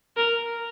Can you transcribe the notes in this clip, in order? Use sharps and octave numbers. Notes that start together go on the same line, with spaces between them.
A#4